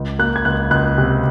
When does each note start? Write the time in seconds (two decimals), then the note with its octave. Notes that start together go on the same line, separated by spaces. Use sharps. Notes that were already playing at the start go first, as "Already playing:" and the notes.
Already playing: C#2
0.19 A#3 F#6
0.36 G#6
0.45 C#2 F#6
0.71 C#2 F#6
0.98 C3